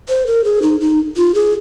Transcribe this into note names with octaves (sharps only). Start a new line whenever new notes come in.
C5
A#4
G#4
D#4
D#4
F4
G#4